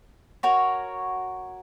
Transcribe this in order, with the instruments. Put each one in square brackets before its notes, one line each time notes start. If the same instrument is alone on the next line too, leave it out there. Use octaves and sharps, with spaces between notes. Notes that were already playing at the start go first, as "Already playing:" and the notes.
[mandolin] F#4 A#4 C#5